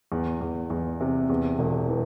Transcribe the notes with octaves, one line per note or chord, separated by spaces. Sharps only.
E2
E2
E2
C3
E2
E1
E3